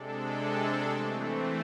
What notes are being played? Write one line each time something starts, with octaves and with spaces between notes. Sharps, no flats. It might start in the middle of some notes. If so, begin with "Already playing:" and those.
Already playing: C3 G#3 D4 A4
E3 A3 C4